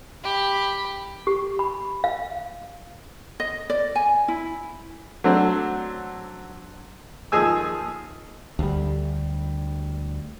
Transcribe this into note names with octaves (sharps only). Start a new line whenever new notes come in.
G4 B5
G4
B5
F5
D#5
D5
G#5
E4
F#3 A3 C4 D4 F#4
D#2 F3 G#4 G#5 E6
D2 G3